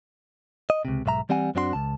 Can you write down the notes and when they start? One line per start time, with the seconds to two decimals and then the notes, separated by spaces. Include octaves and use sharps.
0.70 D#5
0.85 C#2 C3
1.06 B1 G#2 E5 A#5
1.29 E3 G3 C4 F#5 G#5
1.55 F#2 C4 D4 F#4 C#5 C6
1.73 C#2 A5